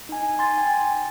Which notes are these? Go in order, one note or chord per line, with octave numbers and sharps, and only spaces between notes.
D#4 G#5
G#5 C6 A6
G5 G#5